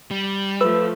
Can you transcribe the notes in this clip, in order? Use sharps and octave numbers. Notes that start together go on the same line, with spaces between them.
G3
F3 A3 B4 E6